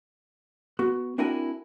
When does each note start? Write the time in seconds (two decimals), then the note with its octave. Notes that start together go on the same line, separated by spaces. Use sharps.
0.79 B3 F#4
1.18 C4 D4 E4 F#4 A#4 G#5